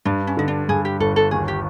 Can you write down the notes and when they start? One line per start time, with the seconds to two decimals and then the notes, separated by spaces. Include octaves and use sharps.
0.05 G2 D4
0.27 C#4
0.37 D3 D#4
0.48 D4
0.69 G2 G#4
0.85 G4
1.00 G1 A4
1.16 A4
1.31 D#2 G#4
1.48 G4